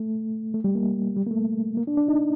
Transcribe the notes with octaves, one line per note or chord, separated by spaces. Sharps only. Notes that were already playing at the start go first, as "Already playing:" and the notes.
Already playing: A3
A3
G3
A#3
G3
A#3
A3
A#3
D4
D4
D#4